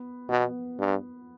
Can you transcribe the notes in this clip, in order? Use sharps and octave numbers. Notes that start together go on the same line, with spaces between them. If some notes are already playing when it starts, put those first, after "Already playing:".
Already playing: B3
B2 B3
G2